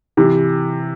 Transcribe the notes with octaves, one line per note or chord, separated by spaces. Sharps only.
C3 E3